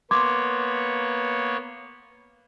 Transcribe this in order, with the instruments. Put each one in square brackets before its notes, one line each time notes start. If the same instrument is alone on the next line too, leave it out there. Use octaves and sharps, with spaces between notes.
[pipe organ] A#3 B3 C#5 [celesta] C6 D6 G#6